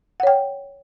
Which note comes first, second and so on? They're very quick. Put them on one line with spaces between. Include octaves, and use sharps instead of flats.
F#5 C#5 G5